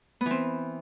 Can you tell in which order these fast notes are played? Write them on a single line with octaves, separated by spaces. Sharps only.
B3 E3 C4